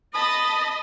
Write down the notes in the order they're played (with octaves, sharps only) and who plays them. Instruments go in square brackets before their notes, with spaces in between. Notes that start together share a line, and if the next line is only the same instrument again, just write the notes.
[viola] D#5 [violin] A5 B5 [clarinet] D#6